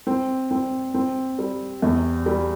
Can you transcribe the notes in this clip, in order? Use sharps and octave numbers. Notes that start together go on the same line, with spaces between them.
C4
C4
C4
G3
E2
G3